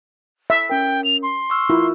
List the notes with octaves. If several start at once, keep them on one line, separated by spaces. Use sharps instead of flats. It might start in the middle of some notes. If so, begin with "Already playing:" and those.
E5
C#4 A#4 G5
F7
C6
C#6 E6 F6
E4 F4 A#4